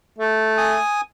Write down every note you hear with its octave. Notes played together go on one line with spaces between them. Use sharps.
A3
G#5 D#6